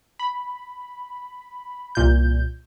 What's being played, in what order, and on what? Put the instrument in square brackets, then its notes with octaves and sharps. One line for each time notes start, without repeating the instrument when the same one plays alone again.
[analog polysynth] B5
C2 A#2 G6